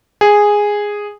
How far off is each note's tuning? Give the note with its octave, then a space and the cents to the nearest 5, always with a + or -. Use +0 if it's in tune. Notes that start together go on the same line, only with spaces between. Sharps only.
G#4 -5